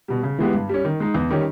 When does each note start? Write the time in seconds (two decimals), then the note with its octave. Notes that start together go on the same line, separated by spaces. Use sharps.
0.08 B2 G3
0.23 C#3
0.38 E3 G#3 B3 G4
0.54 G2
0.69 G3 C#4
0.85 D#3
1.00 G#3 D#4
1.14 E2
1.30 D#3 G3 C#4 G4